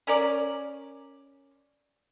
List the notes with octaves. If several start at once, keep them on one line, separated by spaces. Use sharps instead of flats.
C#4 A#4 D5